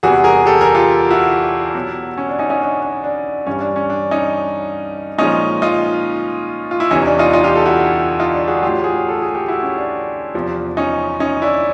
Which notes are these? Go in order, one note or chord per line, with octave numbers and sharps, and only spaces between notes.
E2 C3 E3 G3 F#4 G#4
G#4 A#4
G4 A4
G#4 A#4
F4 G4
E4 F#4
B2 F#3
C#4
D4
C#4 D#4
C#4 D#4
D4
D4
D4
G2 E3 G3 C#4
D4
C#4
D4
C#4 D#4
A#2 F3 G#3 C#4 D#4
D#4 F4
F4
E4
E2 C3 E3 C#4 D#4
D4
D#4 F4
D#4 F4
F4 G4
G4 A4
E4 F#4
D#4 F4
D4
F#4 G#4
A2 F#3 F4 G4
F#4 G#4
A4
G#4
G4
E4 F#4
C#4
D4
E2 C3 F3
C#4 D#4
C#4 D#4
D4 E4